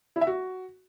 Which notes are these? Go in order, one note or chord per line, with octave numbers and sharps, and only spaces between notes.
E4
E5
F#4